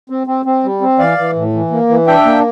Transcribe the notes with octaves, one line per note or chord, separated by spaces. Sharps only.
C4
C4
C4
G3
C4
E3 D5 F5
E3
A2
E3
A#3
E3
D4 E5 G5
A#3